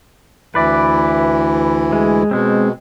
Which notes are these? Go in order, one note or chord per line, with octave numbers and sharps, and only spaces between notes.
D2 E3 E4 B4 D5
G#3
B2 G#3 C4